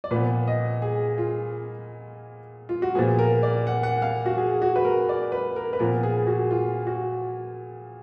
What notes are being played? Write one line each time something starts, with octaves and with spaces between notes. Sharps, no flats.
D5
A#2 F3 B3 B4
D#5
G#4
F4
F4
F#4
A#2 F3 B3 G#4
A#4
D5
F#5
F#5
F5
F#4
G#4
F#4
B4
A#4
D5
B4
A#4
B4
A#2 F3 B3 A#4
G#4
F#4
F4
F#4